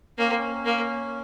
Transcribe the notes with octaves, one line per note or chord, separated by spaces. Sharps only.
A#3 C#4
C4
C#4
A#3